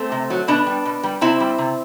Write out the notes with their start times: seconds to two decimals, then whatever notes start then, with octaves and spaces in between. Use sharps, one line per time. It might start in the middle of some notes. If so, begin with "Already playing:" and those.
Already playing: A3 C4
0.12 C3
0.30 F#3
0.48 B2 B3 D4
0.66 G3
0.85 B2
1.03 G3
1.21 C3 C4 E4
1.40 G3
1.58 C3